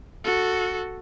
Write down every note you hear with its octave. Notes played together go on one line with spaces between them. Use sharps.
F#4 A4